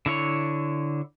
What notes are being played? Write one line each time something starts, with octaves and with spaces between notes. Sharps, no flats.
D3 E4 C#5